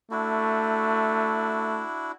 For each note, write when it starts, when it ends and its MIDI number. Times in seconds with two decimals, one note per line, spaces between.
0.11 1.85 57
0.11 2.12 62
0.11 2.12 64
0.11 2.12 66